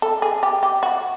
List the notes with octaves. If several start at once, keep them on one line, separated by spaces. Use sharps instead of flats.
A4
G#4
G4
G4
F#4